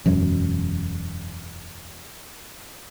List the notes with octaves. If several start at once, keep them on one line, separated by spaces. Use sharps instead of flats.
E1 F#2